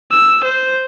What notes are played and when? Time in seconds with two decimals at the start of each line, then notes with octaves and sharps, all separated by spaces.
0.12 E6
0.44 C5